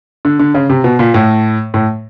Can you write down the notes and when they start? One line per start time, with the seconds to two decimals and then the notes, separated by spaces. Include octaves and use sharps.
0.25 D3
0.40 D3
0.54 C#3
0.70 C3
0.84 B2
0.99 A#2
1.14 A2
1.74 A2